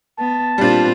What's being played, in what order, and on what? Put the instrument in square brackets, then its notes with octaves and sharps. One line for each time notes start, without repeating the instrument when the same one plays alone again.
[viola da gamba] B3 [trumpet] A5
[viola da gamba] A#2 C4 F4 [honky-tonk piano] G3 D4